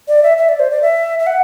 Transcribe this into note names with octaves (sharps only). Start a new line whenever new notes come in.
D5
E5
E5
D5
C5
D5
E5
E5
F#5